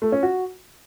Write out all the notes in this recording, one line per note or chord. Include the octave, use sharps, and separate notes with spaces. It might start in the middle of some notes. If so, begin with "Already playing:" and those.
A3
C#4
F#4